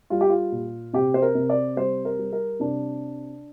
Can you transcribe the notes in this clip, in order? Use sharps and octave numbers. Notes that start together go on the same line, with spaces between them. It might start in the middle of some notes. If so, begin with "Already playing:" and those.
G3 F4
G4
F4
A#2
C3 G4
C5
A#4
C3
D5
G3 C5
A#4
G3
A#4
C3 D4